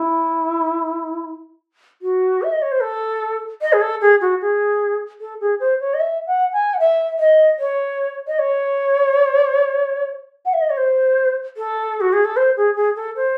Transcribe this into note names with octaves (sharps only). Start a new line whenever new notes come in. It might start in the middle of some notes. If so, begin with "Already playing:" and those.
Already playing: E4
F#4
E5
D#5
C#5
C5
A4
D#5
G#4
A4
G#4
F#4
G#4
A4
G#4
C5
C#5
D#5
E5
F#5
G#5
F#5
E5
D#5
C#5
D#5
C#5
F#5
E5
D#5
C#5
C5
A4
F#4
G#4
A4
C5
G#4
G#4
A4
C5